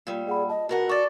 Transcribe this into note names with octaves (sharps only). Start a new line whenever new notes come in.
A#2 G3 A#3
G#4 D5 F#5 B5
D#5 A5
B2 F#4 A#4 F#5
A4 D5 C#6 D6 A6